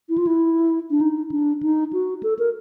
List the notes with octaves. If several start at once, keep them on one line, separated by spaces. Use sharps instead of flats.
E4
F4
E4
D4
D#4
D4
D#4
F#4
A4
A#4